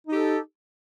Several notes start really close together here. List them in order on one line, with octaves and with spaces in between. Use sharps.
D#4 G4 A4